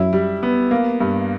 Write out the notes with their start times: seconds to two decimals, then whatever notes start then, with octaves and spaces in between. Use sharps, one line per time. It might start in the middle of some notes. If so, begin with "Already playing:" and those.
Already playing: F#2 F#3 E4
0.13 G3
0.43 B3
0.71 A#3
1.01 G2